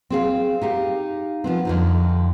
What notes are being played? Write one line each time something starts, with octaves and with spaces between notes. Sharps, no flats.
C4 G#4 F5
D#4 G4 F5
F3 B3 C4
F2 D3 D#4